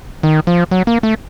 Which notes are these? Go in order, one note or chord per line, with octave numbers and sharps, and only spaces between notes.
D#3
F3
F#3
A#3
A3